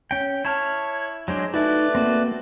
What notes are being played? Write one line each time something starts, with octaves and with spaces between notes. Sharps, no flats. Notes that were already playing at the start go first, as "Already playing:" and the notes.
C#4 G5
E4 C#5 A5 F6
F#3 G#3 D4 C5
A3 D#4 E4 F#4 B4 D5
A#3 C4 F#4